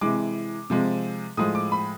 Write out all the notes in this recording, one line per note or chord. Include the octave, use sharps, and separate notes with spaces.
C3 E3 G#3 D6
C3 F3 G#3
A2 F3 G#3 D#6
D6
B5